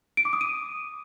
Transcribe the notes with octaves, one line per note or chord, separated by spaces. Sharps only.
D7
D6
D#6
D#7